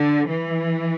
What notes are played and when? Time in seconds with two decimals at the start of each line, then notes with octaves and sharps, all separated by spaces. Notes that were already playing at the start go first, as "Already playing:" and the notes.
Already playing: D3
0.27 E3